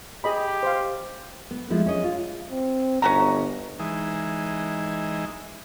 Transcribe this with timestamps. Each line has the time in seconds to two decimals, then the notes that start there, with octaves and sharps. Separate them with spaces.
0.24 G4 G#4 D#5 B5
0.63 C5 F5
1.51 B3
1.70 F3 G#3 A3 E4
1.86 C#4 C#5 D#5
2.04 F4
2.51 C4
3.02 G1 C#4 F#4 A#5
3.79 E3 G#3 D#4